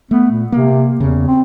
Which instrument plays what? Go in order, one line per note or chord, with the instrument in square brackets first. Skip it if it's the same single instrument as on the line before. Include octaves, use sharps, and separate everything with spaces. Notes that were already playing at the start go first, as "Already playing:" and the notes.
[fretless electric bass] A3 [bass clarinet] B3
[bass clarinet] A#2
[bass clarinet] C3 [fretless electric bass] A#3
[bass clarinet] E2 [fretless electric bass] C#3
[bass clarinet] C4